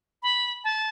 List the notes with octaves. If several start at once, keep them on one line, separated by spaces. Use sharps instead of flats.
B5
A5